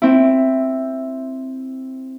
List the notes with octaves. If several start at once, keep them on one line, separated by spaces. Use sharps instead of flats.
C4 E4